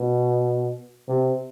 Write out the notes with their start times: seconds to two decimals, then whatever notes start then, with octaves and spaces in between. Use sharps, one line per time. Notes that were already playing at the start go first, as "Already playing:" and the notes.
Already playing: B2
1.08 C3